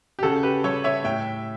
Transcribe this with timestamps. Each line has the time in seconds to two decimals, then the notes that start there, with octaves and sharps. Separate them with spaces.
0.19 G4
0.23 C#3 F#4 A4
0.43 G4 B4
0.64 G3 A4 C#5
0.84 C#5 E5
1.04 A2 E5 G5